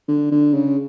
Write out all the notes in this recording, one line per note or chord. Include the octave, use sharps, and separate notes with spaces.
D3
D3
C#3